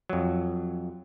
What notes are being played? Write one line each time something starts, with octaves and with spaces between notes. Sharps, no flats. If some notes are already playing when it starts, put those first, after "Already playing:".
F2 F#3